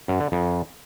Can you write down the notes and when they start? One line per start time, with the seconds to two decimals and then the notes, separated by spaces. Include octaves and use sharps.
0.08 F#2
0.20 D3
0.32 F2